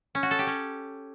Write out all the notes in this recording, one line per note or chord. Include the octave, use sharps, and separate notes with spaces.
C#4
F#4
A4
G4
C#4